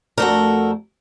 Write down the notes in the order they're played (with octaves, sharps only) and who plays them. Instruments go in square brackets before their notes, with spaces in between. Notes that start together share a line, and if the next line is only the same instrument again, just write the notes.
[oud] F2 A3 D4 [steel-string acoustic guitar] F#4 A4 A#4